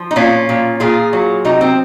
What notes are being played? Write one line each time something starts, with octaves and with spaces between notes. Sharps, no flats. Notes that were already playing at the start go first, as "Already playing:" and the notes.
Already playing: F3
D#4
A#2 C#4 F4
A#2
A#2 F4 G#4
F#3
C3 D#4 F#4
C4